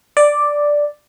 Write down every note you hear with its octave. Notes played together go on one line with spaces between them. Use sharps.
D5